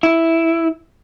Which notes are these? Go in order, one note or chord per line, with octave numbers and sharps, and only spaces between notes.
E4